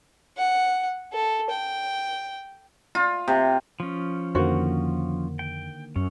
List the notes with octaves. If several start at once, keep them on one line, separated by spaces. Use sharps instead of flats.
F#5
A4
G5
F4
C3
F3 C#4
F2 D3 D#3 A#3 F#4 C5
G5
F#2 C#4